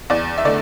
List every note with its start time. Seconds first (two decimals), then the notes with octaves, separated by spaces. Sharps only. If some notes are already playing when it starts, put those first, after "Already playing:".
0.10 E2 D5
0.38 E5
0.45 D3 A3 D5